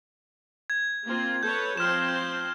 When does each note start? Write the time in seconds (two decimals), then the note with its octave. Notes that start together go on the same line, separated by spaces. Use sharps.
0.70 G#6
1.05 A#3 C4 F4
1.43 A4 B4 C#5 G6
1.77 F3 C4 C5 F6 E7
2.09 G6